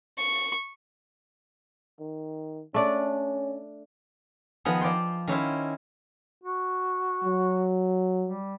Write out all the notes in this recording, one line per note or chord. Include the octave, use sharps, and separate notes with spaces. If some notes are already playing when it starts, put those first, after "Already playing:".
C#6
D#3
A3 C#4 D4 D5
D#3 F3 B3 G#4
F3 D5 G5 C6
D#3 C#4 E4 C5
F#4
F#3
G3